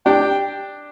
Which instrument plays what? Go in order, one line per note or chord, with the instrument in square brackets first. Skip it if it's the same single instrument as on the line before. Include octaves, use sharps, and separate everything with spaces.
[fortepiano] D4 G4 [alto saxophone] G5